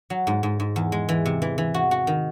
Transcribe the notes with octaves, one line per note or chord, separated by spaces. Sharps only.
F#3
G#2
G#2
G#2
E2
G#3
E3
C3
E3
E3
F#4
F#4
D#3